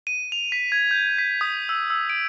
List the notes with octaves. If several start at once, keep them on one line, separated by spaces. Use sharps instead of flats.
D#7
F7
B6
G#6
G6
B6
D#6
E6
E6
D7